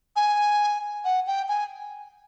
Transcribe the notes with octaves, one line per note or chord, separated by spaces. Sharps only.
G#5
F#5
G5
G#5